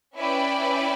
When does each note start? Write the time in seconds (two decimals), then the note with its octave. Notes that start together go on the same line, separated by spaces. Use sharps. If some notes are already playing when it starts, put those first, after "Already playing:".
0.17 C#4 E4 B4 D5 G5